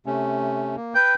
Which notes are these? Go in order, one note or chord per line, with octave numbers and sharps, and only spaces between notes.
C3 A3 C#4
A#3
B4 G5 G6